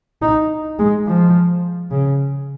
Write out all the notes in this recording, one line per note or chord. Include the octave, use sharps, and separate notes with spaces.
D#4
G#3
F3
C#3